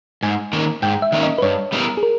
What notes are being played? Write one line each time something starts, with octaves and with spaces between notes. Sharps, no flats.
G#2 G#5
D#3 A#3 C#4
G#2 G5
E5
D#3 A#3 C#4
D#5
B4
G2 C#5
G3 B3 E4 A#4
G#4
A#4